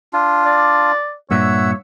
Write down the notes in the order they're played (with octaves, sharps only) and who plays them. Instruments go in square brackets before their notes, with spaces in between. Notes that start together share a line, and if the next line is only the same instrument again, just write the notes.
[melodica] D4 F4
[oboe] D5
[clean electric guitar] G2 A#2 [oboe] C#5 [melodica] E5 F#5 E6